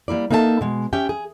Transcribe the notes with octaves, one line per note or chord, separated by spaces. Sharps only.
G3 A#3 E4 D5
A#3 D#4 A4 E5 F#5 A5
B2 G#3
C#4 G4 E5 G5
G#4